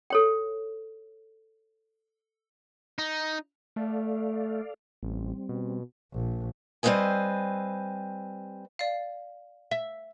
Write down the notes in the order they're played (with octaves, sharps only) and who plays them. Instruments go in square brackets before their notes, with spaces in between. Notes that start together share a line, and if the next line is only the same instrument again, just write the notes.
[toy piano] A4 C#5 G5
[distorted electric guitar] D#4
[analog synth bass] A3 [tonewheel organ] A4 D5 F5
[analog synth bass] A1 [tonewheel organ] G3 C4
[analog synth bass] B2
[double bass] A#1
[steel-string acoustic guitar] G3 C4 B4 C5 D#5 G#5
[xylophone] D5 F5
[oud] E5